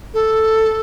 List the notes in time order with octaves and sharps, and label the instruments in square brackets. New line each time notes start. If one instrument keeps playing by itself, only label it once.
[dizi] A4